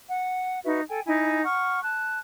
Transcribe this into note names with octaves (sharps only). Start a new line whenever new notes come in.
F#5
D#4 F#4 B4 E5
A4 G5 G#5
D#4 E4 G#5
F#5 C#6 F6
A5 F#6